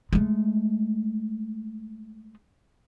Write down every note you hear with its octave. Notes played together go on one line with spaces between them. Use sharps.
G#3 A3